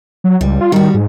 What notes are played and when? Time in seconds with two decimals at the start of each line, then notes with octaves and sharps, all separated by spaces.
0.24 F#3
0.41 C#2 G3
0.61 F4
0.72 D#3 G3 F#4
0.94 G#2